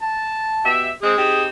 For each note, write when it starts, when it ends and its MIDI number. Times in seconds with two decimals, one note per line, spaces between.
0.02 0.67 81
0.65 0.89 47
0.65 0.89 67
0.65 0.89 76
1.02 1.14 56
1.02 1.14 60
1.02 1.42 68
1.17 1.48 60
1.17 1.48 63
1.17 1.48 67